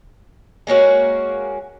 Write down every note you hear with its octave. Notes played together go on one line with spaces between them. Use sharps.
G#3 A#3 C#4 F#4